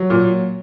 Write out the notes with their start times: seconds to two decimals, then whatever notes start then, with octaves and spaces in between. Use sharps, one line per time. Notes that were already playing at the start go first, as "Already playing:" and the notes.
Already playing: F#3
0.10 A#2